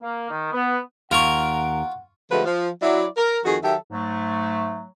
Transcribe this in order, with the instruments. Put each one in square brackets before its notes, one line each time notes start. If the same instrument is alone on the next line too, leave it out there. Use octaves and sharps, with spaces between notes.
[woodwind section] A#3
D#3
B3
[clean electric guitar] D#2 A#4 [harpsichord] F4 C#6 [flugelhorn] F#5
[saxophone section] D3 F3 G#3 A3 F#4 B4
F3
F#3 E4 D5
A#4
F2 D#3 F#4 G#4
D#3 F#3 G4 A4 E5
[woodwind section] G#2 F#3 A3